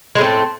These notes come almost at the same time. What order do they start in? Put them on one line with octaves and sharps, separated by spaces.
G#3 A2 C4 A3